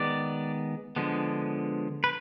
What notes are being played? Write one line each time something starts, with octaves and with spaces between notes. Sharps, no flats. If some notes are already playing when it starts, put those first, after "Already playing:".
Already playing: D#3 G#3 B3 D5
D3 F3 G#3 B3
B4